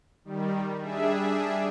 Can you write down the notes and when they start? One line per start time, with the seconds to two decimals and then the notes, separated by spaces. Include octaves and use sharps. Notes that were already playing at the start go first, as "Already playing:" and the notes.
0.25 D#3 G3
0.82 G3 D4 G#4 E5